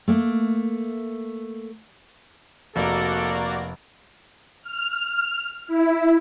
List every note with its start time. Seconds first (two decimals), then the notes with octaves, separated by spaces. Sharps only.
0.08 A3 A#3
2.76 F1 A#3 F#4 A4 D5 A#5
4.63 F6
5.68 E4